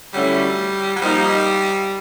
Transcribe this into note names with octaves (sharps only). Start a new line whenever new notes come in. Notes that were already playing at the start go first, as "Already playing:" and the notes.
D3 F#3 G3 A3 C#4 E4
F#3
F3 G3 A#3 D#4 G4